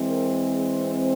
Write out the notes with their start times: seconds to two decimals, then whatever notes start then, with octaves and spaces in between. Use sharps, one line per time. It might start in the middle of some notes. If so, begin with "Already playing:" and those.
Already playing: E3 G#3 C4
0.09 A#4
0.39 G#4